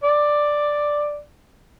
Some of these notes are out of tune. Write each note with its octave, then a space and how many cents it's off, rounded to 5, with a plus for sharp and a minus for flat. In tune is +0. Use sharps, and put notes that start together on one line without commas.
D5 +5